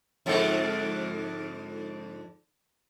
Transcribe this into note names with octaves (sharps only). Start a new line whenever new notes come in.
F2 G#2 D3